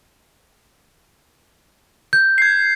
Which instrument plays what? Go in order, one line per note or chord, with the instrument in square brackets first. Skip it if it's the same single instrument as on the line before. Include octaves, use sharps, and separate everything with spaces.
[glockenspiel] G6
[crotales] G#6 C7